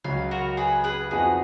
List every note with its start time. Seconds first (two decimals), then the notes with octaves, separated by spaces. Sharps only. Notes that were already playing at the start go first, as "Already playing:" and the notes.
0.04 C#2 C#3 F#3 C#4 F4
0.31 F#4 A#4
0.57 G#4 B4
0.84 G#4 B4
1.11 F2 F3 B3 D#4 F#4 G#4